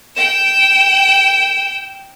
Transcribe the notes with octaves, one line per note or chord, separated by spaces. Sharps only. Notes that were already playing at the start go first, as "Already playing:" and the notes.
G5 E7